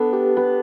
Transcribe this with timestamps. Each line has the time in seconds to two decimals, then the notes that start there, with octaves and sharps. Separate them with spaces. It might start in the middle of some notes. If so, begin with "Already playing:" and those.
Already playing: B3 D4 A4 B4
0.13 G4
0.37 B3 G4